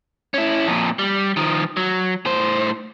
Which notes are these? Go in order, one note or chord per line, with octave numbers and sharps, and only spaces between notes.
C#4 E4
F2 A#2
G3
D#3 F3
F#3
A2 C5